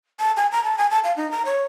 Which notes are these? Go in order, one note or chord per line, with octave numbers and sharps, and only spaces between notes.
A5
G#5
A#5
A5
G#5
A5
F5
D#4
A#5
C#5